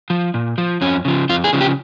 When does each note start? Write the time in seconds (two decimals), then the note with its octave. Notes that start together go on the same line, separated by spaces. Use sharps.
0.10 F3
0.34 A#2
0.58 F3
0.81 F2 C#4
1.05 C#3 F3
1.29 F2 F4
1.44 G#4
1.53 C#3 F3
1.61 G4